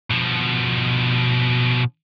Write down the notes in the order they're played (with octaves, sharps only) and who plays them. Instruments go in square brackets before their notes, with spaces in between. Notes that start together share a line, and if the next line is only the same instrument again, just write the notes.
[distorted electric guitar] B2 F3